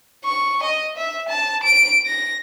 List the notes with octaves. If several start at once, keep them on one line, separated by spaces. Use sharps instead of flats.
C#6
D#5
E5
A5
D7
A#6